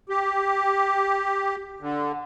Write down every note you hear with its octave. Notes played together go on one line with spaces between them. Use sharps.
G4
D3